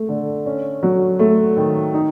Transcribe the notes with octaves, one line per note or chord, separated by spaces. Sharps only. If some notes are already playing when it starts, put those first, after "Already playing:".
Already playing: A3
D3
C#4
F#3
A3
D#3
D#4